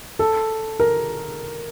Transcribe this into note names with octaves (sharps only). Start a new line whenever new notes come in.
A4
A#4